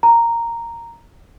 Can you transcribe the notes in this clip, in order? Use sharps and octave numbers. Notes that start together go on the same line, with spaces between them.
A#5